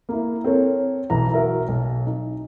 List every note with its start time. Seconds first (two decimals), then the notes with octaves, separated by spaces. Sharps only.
0.09 A#3 E4
0.44 C4 A4 A#4 C#5
1.10 B1 E3 A#5
1.34 F#4 A#4 E5
1.68 B1
2.07 D#4